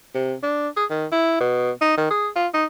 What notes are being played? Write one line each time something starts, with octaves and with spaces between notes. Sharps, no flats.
C3
D4
G#4
D#3
E4
B2
D#4
D#3
G#4
F4
D#4